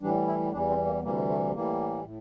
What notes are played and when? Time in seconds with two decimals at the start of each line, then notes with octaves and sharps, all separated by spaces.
0.02 A2 E3 G3 D4
0.27 E4
0.53 E2 E3 G3 D4
0.69 C4
0.86 A#3
1.03 D2 C3 E3 G3 A#3
1.29 A3
1.54 A2 E3 G3 A#3
2.05 A2